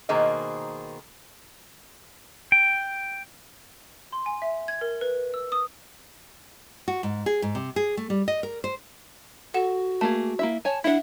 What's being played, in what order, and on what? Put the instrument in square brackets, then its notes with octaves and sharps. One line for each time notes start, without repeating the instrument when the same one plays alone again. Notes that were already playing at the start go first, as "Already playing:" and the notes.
[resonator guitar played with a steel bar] B2 D#3 A#3 G#4 C5 D#5
[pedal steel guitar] G5
[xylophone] C6
G#5
E5
G#6
A#4
B4
E6
D#6
[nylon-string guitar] F#4
G#2
G#4
G#2
C3
G#4
A3
G3
D#5
A#4
C5
[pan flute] F#4 [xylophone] A4 F#5 E7
[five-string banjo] A3 A#3 G#4 [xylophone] A5
[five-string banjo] A#3 E4 E5
[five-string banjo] C#5 G#5 [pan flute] A5
[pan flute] D4 [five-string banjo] E4 F#5 [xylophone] E5